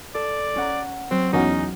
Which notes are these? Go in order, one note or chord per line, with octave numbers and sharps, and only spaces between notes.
A4 D5
C#4 F#5 A#5
F#3 C4
E2 C#4 D#4 F#4